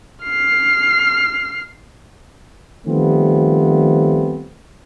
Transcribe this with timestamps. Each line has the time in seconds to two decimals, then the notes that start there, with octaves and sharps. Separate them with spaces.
0.23 F6 C7
2.86 D#3 F3 G3 A3 B3 C4